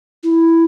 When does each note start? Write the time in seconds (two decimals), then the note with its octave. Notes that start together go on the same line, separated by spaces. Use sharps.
0.23 E4